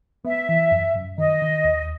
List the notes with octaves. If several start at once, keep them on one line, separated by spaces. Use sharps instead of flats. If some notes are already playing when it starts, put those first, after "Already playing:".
B3 E5
E3
F#2
F#2
D#3 D#5
D#3
D#2